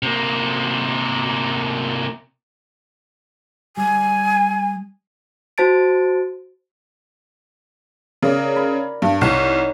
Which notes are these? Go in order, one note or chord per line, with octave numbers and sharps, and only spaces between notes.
C3 A#3
G3 G#5
F#4 C5 A5 A6 D7
C#3 A#4 D5
B5
G2
C2 D#4 C#5 D5